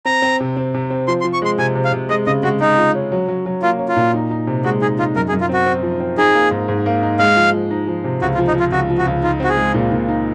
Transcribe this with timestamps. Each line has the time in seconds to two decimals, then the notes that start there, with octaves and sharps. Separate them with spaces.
0.05 C4 A#5
0.22 C4
0.40 C3
0.57 C4
0.74 C3
0.90 C4
1.08 F3 C6
1.21 C6
1.24 F3
1.33 C#6
1.42 G#3 C6
1.58 C3 G#5
1.75 C3
1.85 F5
1.93 C3
2.09 G#3 D#5
2.27 C#3 D#5
2.43 G#3 F#4
2.60 G#3 D#4
2.78 F4
2.95 C#4
3.12 F#3
3.28 F#3
3.46 F#3
3.62 A#3 F4
3.79 C#4
3.89 F4
3.96 A#2
4.14 D#4
4.31 D#4
4.47 C3
4.64 G#3 F#4
4.82 D#4 G#4
4.99 D#4 F4
5.15 F#2 A#4
5.29 G#4
5.32 F#2
5.41 F4
5.49 C4 F#4
5.66 C4
5.83 F3
6.00 C4
6.18 D#4 G#4
6.35 A#3
6.51 G#2
6.68 G#2
6.86 A#3
7.03 D#4
7.19 G#3 F5
7.37 F3
7.53 F3
7.71 D#4
7.88 F3
8.04 C3
8.22 C#2 F#4
8.34 F4
8.39 F3
8.47 D#4
8.55 F3 F4
8.72 C#2 F#4
8.90 F3
8.98 F#4
9.07 C#2
9.23 D#4 F4
9.40 C4 F#4
9.49 G#4
9.57 G#3
9.74 A#2
9.92 A#2
10.09 D#4